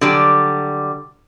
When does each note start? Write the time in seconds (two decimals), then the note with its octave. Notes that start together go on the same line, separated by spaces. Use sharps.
0.01 D3 F#3 G3 D5